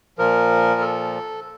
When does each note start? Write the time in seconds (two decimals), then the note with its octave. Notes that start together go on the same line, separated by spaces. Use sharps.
0.18 A#2 F3 A#4
0.81 A4